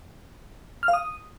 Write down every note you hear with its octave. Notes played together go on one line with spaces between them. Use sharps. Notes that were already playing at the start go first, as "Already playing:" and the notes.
F6
F5
D#6